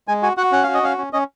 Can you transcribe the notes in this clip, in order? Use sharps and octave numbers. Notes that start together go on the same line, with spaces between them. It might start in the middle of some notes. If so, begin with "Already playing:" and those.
G#3 G#5
F#4 G#5
F#4 F#5
C#4 F#5
F#4 F5
D#5
C#4 F5
C#4
C#4 D#5